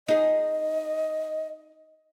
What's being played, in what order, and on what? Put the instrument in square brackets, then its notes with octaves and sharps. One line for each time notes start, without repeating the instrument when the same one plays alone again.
[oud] D#4 G#4 [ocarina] D#5